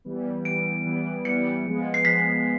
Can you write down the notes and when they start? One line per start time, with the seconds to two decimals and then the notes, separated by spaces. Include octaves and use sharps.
0.05 E3 G3 B3
0.45 E3 G3 B3 D7
0.85 E3 G3 B3
1.25 E3 G3 B3 C#7
1.66 F3 G#3 B3
1.94 C7
2.05 F3 G#3 B3 B6